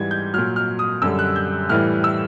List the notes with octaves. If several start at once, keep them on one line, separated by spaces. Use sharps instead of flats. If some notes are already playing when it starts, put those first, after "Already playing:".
Already playing: G#2 E3 G3 G#6
G6
A#2 F#3 F6
F6
D#6
F#2 D3 G3 E6
F#6
G6
A2 E3 G3 F6
E6